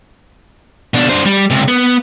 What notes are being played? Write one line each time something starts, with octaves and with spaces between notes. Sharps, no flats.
B2 D4
D4 C5
G3
C#2 C3
B3